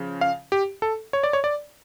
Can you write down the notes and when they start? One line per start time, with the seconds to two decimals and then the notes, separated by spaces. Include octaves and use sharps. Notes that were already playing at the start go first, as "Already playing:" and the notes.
Already playing: C#3 F3
0.21 F5
0.52 G4
0.82 A4
1.13 C#5
1.23 D5
1.33 C#5
1.44 D5